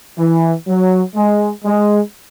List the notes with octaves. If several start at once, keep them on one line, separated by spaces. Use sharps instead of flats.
E3
F#3
G#3
G#3